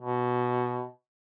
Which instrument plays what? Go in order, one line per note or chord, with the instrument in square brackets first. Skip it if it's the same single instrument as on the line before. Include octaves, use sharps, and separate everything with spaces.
[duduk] B2